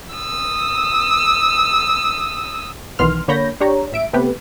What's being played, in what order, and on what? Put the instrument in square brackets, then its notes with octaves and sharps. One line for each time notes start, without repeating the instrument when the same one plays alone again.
[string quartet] D#6 E6
[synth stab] B1 D#3 E3 B3 C6 F6
D3 A#3 C#5 B5 G6 A#6
D4 G4 C#5 A#5
A1 E5 D7
C3 A3 B3 G4 B4